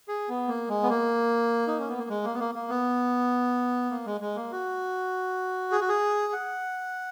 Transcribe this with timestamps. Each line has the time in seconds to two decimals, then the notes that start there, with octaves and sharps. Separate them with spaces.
0.08 G#4
0.29 B3
0.48 A#3
0.69 G#3
0.83 B3
0.89 A#3
1.67 D#4
1.78 C#4
1.89 B3
1.99 A#3
2.10 G#3
2.24 A#3
2.34 B3
2.40 A#3
2.55 A#3
2.69 B3
3.90 A#3
4.06 G#3
4.21 G#3
4.36 A#3
4.52 F#4
5.72 G#4
5.81 F#4
5.89 G#4
6.33 F#5